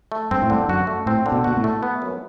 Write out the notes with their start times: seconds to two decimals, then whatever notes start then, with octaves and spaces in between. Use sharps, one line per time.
0.12 A3
0.31 G2 C4
0.42 A2
0.50 G2 D3
0.69 F#2 F#4
0.87 A3
1.06 A2 C4
1.26 D3
1.32 B2
1.44 B2 F#4
1.57 A2
1.64 A3
1.83 B3
2.02 F#2